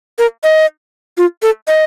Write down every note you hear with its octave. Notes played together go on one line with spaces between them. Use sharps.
A#4
D#5
F4
A4
D#5